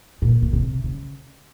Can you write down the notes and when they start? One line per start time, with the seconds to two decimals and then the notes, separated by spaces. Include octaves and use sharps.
0.22 A#2
0.42 B2
0.53 C3
0.84 C#3